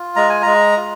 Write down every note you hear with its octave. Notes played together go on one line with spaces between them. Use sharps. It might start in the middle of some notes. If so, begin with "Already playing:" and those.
Already playing: F4
G#3 A#5
G#5
G#3 A#5
F4